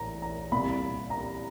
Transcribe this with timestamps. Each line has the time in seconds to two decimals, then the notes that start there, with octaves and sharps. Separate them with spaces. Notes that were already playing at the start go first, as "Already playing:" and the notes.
Already playing: A#1 A2 E3 A#5
0.22 A#5
0.52 C2 A#2 B5
1.10 A#5